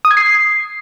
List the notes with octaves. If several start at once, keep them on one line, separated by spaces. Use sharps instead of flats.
D#6
G#6
C7